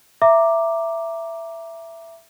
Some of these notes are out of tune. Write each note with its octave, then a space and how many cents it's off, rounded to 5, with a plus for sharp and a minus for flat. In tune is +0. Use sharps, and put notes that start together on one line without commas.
E5 +15 A#5 +0 D6 +0